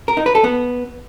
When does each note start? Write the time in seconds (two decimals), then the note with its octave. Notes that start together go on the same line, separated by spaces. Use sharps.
0.08 A#4
0.17 D#4
0.26 B4
0.35 A4
0.44 B3